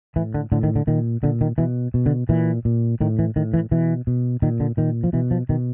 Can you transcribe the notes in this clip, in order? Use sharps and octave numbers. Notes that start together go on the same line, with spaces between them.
A2 E3
D3
A2 D3
D#3
D3
A#2 D#3
A#2 D3
D#3
B2 E3
B2
D3
A#2 E3
A#2
A2 D#3
E3
A2 D#3
E3
B2 E3
B2
A#2 D#3
D3
A#2 D#3
F3
B2 E3
F3
B2 D#3